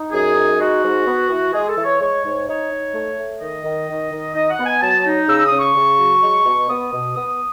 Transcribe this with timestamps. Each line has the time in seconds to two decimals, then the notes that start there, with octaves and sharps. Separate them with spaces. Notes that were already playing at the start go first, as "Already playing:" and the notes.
Already playing: D#4
0.12 F#2 G#4
0.35 D#4
0.59 G#3 F#4
0.83 G#2
1.05 B3
1.29 E3
1.53 G#3 G#4
1.68 A4
1.76 E3
1.84 C#5
2.00 G#3 C#5
2.24 G#2
2.47 D#4 C#5
2.70 D#4
2.94 A3
3.17 A3
3.40 D#3 D#5
3.64 D#3
3.88 D#3
4.11 D#3
4.34 D#4 D#5
4.50 F#5
4.58 B3
4.65 G#5
4.81 F#3 A5
5.04 D#4
5.28 C#3 E6
5.44 D#6
5.51 C#3
5.59 C#6
5.75 C#3
5.98 F#3
6.21 G#3
6.46 B2
6.68 B3 D#6
6.92 B2
7.15 B3 D#6